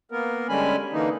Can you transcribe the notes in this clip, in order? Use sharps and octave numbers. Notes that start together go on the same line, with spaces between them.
A#3 B3 A#4
D3 G3 G#3 C#4 G#5 B5
D3 E3 A#3 D#4